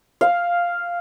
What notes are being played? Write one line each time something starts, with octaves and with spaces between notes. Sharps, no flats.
F5